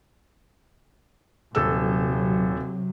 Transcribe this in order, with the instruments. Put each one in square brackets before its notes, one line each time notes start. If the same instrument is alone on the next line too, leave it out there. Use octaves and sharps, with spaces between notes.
[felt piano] D#1 A4 E6 [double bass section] C3 F#3